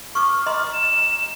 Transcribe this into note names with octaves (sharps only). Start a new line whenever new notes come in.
C#6 D6 F6
D#5 A#5 C6
E7